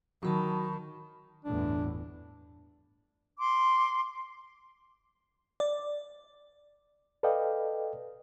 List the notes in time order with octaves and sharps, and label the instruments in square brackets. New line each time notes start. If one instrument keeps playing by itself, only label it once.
[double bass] D#3 [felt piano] F#3 [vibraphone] A5 B5 C#6
[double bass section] G1 E2 A2 [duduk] D4
[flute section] C6 D6
[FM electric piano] D5
[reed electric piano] A4 B4 D5 D#5 F5 G5